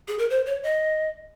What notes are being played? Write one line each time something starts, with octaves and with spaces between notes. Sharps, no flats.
G#4
A#4
C5
C#5
D#5